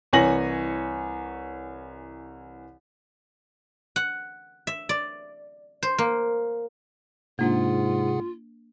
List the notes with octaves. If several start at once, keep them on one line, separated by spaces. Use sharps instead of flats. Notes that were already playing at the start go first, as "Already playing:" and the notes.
C2 E3 C#5 G#5 A#6 F#7
F#5
E5
D5
C5
A#3
G#2 C3 A#3 D4 F4 G#4 F#5